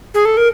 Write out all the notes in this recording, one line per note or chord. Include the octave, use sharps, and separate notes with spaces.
G#4
A4
A#4